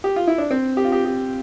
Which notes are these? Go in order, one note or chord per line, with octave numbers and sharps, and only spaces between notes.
G4
F4
E4
D4
C4
G4
F4
G4
G4